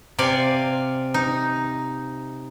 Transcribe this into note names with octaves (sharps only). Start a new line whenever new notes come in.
C3 D5 F5 G#5
D#4